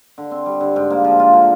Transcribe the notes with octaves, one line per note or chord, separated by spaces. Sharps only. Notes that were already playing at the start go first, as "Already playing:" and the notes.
D3
C4
G3
D3
G#2
A#3
F3
F4
D3